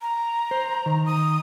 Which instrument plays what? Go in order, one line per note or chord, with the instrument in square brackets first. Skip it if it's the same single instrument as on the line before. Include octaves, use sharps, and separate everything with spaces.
[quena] A#5
[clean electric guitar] C5
D#3
[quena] D#6